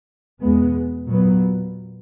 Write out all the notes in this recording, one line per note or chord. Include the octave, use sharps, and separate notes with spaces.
E2 B2 G#3 B3
A#2 F#3 B3